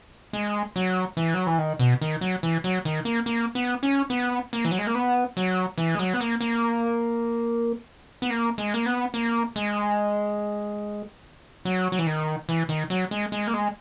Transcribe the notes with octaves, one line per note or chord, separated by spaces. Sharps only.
G#3
F#3
E3
F#3
E3
D#3
B2
D#3
F#3
E3
F#3
D#3
A#3
A#3
B3
C#4
B3
A#3
E3
F#3
G#3
A#3
B3
F#3
E3
G#3
F#3
B3
A#3
A#3
B3
A#3
G#3
A#3
B3
A#3
G#3
F#3
F#3
E3
D#3
E3
D#3
F#3
G#3
G#3
A#3
G#3